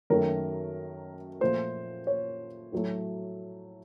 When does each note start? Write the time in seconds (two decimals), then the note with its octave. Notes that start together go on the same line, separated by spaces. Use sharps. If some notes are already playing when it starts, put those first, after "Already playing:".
0.10 F#2 D#3 F#3 A3 A#4
1.41 A#2 F3 A3 C5
2.07 C#5
2.72 A2 F#3 A3